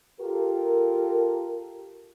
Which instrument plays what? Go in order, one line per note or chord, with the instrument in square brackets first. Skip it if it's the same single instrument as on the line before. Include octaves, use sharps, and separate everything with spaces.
[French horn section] F4 G4 A4 A#4